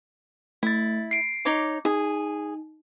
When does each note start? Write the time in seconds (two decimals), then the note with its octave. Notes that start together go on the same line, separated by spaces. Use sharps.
0.63 A3 E4 A6
1.11 C7 D7
1.45 D#4 C#5 D6
1.85 D#4 G#4